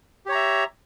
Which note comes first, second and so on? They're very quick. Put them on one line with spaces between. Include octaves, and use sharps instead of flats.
G4 C#5 A#5 E5